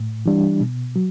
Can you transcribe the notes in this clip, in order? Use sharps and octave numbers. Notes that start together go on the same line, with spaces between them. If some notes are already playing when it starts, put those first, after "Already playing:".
Already playing: A2
E3 G3 D4
B2
F#3